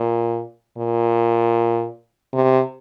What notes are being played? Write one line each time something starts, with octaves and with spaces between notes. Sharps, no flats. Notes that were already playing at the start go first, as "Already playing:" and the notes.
Already playing: A#2
A#2
C3